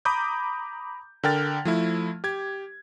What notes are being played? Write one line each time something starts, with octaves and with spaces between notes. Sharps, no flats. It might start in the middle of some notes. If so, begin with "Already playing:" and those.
A#5 B5 D6 D#6 G6
D3 A#4 G5 F6 A6
F3 A3 E4
G4 G#6